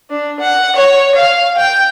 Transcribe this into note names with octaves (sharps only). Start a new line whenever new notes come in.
D4
F#5
C#5
F5
G5